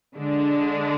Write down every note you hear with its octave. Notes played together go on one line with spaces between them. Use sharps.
D3 G#3 D4